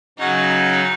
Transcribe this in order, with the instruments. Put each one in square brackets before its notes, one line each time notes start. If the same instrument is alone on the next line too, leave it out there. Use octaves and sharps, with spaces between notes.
[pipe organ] C#3 F#3 C#4 F#4 [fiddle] D#4